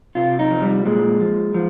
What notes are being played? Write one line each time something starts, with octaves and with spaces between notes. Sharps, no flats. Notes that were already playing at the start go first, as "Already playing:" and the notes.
C3 F4
D#4
F3
G3
A#2 G#3
F3
F3